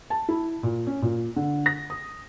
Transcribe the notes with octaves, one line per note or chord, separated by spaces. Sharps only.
A5
E4
A#2
C#4
A#2
D3
A#6
D#6